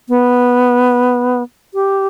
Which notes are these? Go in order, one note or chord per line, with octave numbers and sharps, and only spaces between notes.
B3
G4